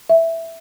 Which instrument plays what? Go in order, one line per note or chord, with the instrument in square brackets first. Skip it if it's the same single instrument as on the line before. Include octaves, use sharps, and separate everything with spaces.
[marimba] E5